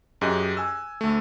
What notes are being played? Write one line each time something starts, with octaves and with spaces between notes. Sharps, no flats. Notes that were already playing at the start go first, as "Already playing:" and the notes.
F#2 G4 G#4 D#5 F#6
G#5 E6
D2 A3